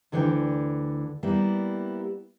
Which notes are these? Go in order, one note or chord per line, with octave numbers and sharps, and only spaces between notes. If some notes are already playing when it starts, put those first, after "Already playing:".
D2 D3 E3 A4 D5 G5
G3 A#3 B3 E4